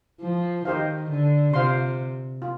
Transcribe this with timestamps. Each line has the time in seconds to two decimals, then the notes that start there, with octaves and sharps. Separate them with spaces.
0.21 F3
0.65 D#3 D#4 G4 C5 F5
1.09 D3
1.54 C3 F4 C5 F5 C6
2.42 F4